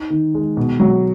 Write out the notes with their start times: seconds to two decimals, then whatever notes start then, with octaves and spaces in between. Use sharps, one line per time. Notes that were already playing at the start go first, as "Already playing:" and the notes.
Already playing: D#4
0.10 D#3
0.35 G#3
0.57 B2
0.80 F#3